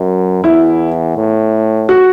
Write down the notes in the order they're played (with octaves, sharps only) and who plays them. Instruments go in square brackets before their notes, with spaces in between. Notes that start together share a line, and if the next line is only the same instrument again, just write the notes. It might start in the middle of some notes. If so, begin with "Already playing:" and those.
Already playing: [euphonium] F#2
[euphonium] E2 [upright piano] E4
[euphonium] A2
[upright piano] F#4